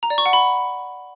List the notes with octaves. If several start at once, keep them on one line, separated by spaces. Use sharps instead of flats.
A#5
D5
C#6
F#5
B5